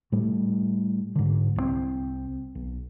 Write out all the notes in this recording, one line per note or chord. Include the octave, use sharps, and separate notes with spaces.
A2 G3 A3
G#2 D3
C2 E3 C4
B1